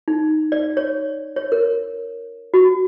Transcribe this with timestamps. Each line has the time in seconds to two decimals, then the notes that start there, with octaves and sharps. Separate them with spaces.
0.08 D#4
0.52 D5
0.77 C#5
1.36 C#5
1.52 A#4
2.54 F#4